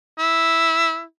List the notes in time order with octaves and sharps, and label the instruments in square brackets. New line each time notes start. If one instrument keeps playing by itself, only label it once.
[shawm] E4